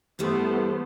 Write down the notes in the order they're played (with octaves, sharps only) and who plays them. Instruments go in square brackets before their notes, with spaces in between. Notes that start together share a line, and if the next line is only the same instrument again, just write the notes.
[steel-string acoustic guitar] G2 E3 G3 [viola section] A3 B3 C5